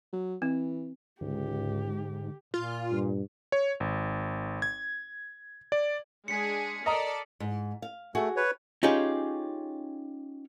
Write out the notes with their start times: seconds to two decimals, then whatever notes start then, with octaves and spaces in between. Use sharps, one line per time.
0.13 F#3
0.42 E3 C4
1.21 C#2 G#2 D3 G4
2.54 A#2 F4
2.91 G2
3.52 C#5
3.80 G#1
4.62 G#6
5.72 D5
6.28 G#3 D4 G#4 B6 C#7
6.86 A4 A#4 D5 D#5 A#5 D#6
7.40 G#2
7.82 F5
8.15 A3 F#4 G#4
8.36 B4 C#5
8.83 C#4 D#4 F4 G4 G#4 C#5